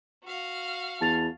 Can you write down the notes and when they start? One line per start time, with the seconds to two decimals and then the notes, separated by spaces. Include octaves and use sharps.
0.24 F#4 F5
1.01 E2 A5 A6 F7